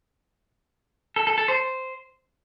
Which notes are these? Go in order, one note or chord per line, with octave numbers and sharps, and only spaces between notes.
A4
A4
A4
C5